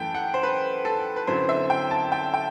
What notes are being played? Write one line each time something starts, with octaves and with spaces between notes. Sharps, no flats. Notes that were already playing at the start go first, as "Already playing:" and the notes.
Already playing: F#2 E3 A3 G5 A5
F#5
C5
B4
A4
B4
F#2 D3 F#3 C4 E4 C5
E5
G5
A5
G5
G5